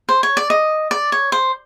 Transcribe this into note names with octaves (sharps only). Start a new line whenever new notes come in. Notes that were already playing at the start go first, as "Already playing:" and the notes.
C5
C#5
D5
D#5
D5
C#5
C5